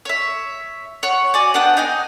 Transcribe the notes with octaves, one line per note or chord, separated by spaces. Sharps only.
C#5 E5
C#5 F#5 C#6
F#4 D5 G#5
B3 D4 F#5 G5
D#4 D#5 G#5